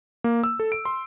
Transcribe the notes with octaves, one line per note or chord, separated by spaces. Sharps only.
A#3
E6
A4
D7
C6